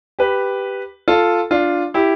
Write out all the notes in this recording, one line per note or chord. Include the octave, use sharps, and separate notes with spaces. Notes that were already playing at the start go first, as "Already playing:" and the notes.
G4 B4
F4 A4
D4 F4
E4 G4